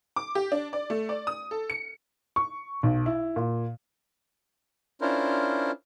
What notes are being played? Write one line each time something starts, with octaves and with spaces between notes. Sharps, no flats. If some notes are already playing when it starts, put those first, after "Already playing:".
D6
G4
D4
D5
A3
D5
D#6
A4
C#7
C#6
B1
E4
A#2
C#4 D4 E4 F4 A#4 C5